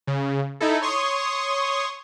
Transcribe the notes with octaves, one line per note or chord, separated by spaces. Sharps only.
C#3
D#4 E4 A4
C#5 C6 C#6 D#6